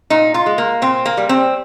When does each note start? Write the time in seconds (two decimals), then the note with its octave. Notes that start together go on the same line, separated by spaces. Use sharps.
0.10 A#2 D#4
0.34 F4
0.46 G#3
0.58 A#3
0.82 A#2 C4
1.06 A#3
1.17 G3
1.29 C4